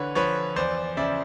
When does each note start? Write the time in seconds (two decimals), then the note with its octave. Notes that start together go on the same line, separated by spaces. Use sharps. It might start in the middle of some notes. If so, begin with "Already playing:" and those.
Already playing: D3 E3 B4 C#5
0.15 F3 B4 C#5
0.56 E2 C5 D5
0.97 C#3 D5 E5